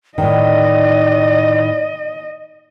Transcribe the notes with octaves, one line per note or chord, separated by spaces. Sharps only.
A2 D#3 D5 D#5